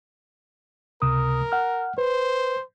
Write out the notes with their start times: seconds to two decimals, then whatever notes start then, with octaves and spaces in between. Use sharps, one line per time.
1.02 C#2 C3 A#4 D#6
1.52 F#5 F6
1.98 B4 C5